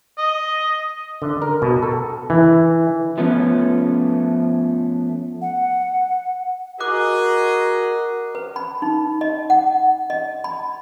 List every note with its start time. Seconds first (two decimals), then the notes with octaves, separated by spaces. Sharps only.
0.18 D#5
1.22 D3
1.42 A#4
1.62 B2
1.83 A4
2.30 E3
3.18 F3 A3 B3 C#4
5.42 F#5
6.80 F#4 G#4 A#4 D#5 D6 F#6
8.35 B4
8.56 B5
8.82 D#4
9.21 D#5
9.50 F#5
10.10 D#5
10.44 B5